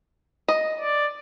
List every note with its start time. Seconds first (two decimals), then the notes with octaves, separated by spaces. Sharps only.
0.48 D#5
0.80 D5